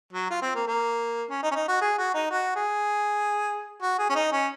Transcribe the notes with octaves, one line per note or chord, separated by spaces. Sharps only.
F#3
F4
C4
A#3
A#3
C#4
D#4
C#4
D#4
F#4
G#4
F#4
D#4
F#4
G#4
F#4
G#4
C#4
D#4
C#4